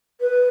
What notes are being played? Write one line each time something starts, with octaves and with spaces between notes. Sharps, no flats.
B4